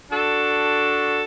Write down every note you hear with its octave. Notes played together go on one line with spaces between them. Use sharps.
D4 F#4 A4